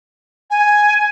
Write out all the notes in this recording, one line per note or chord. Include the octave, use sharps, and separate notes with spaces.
G#5